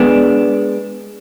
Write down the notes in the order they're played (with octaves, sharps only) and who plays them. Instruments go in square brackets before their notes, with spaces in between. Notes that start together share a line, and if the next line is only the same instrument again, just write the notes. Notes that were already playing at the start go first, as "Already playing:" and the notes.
Already playing: [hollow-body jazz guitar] G#3 B3 D4